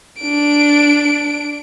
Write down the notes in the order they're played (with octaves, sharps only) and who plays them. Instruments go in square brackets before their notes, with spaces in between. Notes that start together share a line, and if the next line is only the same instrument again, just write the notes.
[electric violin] D4 D7